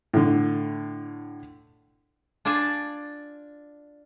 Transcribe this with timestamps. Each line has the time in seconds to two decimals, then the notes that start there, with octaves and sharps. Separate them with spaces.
0.14 A2 D3
2.45 D4 F4 D5 G#5 A5